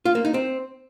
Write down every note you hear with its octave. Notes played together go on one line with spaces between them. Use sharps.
F4
A#3
D#4
C4